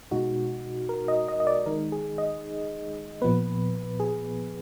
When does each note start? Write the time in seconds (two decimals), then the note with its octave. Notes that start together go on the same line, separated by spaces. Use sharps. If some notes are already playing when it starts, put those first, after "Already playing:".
0.11 B2 G#3 D#4 F#4
0.89 A#4
1.08 D#5
1.28 D#5
1.40 D#5
1.47 D5
1.66 D#3 G#3 D#4 A#4
1.92 G#4
2.18 D#5
3.22 A#2 F3 B3 B4
4.00 G#4